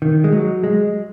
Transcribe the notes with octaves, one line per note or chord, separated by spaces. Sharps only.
D#3
G#3
F#3
G#3